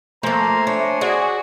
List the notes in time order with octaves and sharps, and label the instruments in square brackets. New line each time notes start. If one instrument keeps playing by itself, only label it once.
[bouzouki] F3 A#3 [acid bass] A3 [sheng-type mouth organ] C5 G#5 [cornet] A#5
[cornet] D4 [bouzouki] C#5
[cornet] F#4 [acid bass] G#4 [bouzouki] D5